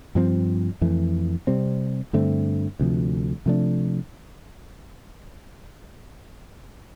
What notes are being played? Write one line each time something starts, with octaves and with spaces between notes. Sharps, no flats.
G2 F3 C4
F2 E3 A3
C3 G3 C4
G2 D3 A3 C4
D2 C3 F3
C3 F3 A3 D4